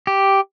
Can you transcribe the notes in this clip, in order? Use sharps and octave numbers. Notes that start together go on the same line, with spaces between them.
G4